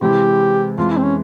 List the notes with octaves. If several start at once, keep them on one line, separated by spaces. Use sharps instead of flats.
C3 E3 G#3 C4 E4 G4
F2 E3 G#3 F4
E4
C4
C#4